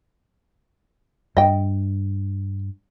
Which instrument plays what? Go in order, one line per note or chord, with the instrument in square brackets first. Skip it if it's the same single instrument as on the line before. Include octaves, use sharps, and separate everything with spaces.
[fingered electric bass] G2 [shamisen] D#5 G5